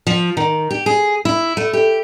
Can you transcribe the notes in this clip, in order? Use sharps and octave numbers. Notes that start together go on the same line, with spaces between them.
F3
D#3
G4
G#4
E4
A3
G4